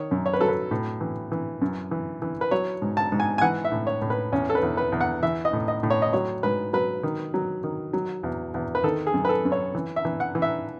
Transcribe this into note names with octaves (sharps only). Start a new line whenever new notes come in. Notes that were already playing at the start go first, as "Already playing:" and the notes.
Already playing: D#3 C#5
F#2
C#5
B4
F#3 A4
B4
A2
E3
E3
F#2
E3
E3
B4
F#3 C#5
G#2
A5
G#2
G#5
G#5
E3 F#5
E5
A2
C#5
A2
B4
E2 C#4
A4
B4
E2
B4
E2
F#5
E3 E5
D#5
A2
D#5
A2
C#5
D#5
F#3 C#5
G#2 B4
F#3 B4
D#3
F#3
D#3
F#3
E2
E2
B4
D#3 A4
G#4
F#2
B4
A4
F#2
C#5
E3
E5
E3
F#5
E3
E5